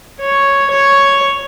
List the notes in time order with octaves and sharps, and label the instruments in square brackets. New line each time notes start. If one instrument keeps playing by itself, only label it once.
[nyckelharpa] C#5
C#5